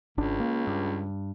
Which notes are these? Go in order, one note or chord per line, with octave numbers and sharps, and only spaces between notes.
G#1 C#2 D4
A#3
G2